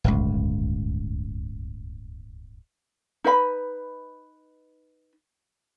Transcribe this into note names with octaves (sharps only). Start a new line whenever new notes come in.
D1 G1 C#2
D#4 B4 E5 B5